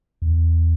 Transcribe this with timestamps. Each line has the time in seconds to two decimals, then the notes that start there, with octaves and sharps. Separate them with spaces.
0.22 E2